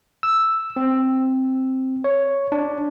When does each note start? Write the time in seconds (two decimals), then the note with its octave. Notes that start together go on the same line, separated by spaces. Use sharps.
0.23 E6
0.76 C4
2.04 C#5
2.52 D4